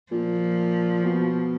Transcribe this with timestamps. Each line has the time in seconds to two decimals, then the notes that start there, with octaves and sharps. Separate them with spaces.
0.11 A#2 F3
1.04 B2